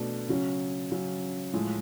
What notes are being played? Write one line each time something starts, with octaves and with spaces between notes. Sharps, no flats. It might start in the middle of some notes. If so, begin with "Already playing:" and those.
Already playing: B2 A3 D4
C#3 F#3 C#4
C#3 F#3 C#4
A2 F3 G#3